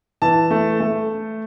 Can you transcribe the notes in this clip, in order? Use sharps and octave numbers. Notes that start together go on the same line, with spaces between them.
E3 A5
A3
A3